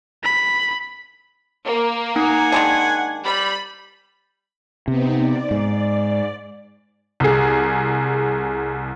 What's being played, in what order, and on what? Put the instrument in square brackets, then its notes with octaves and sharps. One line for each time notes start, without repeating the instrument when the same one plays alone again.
[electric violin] B5
[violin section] A#3
[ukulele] D#4 [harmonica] F#5 G#5
[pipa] D#3 G#3 D4
[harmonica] G3 [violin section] B5
[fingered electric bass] C3 [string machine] B3 C4 D#4
[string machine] D5
[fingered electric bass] G#2
[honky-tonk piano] C2 G#4